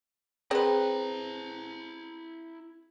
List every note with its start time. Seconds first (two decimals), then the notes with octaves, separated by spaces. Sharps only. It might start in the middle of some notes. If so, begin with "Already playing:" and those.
0.51 C4 E4 G#4 B4 A#5